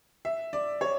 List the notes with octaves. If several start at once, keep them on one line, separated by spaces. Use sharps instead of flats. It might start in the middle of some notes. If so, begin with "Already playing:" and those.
E5
D5
C#5